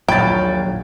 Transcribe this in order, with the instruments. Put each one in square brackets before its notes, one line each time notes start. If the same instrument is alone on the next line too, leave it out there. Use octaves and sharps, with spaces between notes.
[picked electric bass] A#1 F#3 [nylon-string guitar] D#2 A#2 [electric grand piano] C#5 B5 A6 [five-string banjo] G5